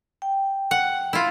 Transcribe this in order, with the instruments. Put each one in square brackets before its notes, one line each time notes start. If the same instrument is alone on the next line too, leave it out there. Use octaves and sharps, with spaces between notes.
[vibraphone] G5
[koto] F#5
E4 F4